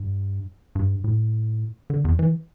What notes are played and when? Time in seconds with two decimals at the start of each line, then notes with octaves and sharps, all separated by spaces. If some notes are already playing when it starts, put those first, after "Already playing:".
Already playing: G2
0.75 G2
1.04 A2
1.90 D3
2.05 E2
2.19 E3